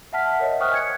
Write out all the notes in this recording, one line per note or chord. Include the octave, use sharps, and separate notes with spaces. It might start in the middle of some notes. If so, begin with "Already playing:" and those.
E5 F#5 A5 F6 B6
A#4 C#5 D#5 E5
C5 G5 C#6 D#6 F6 F#6
G#5 G#6 C#7